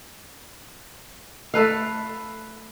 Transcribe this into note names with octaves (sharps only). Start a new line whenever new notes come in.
A3 A4 B4 F5